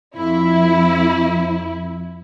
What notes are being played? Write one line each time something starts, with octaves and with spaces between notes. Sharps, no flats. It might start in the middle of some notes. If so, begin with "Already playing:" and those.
F2 E4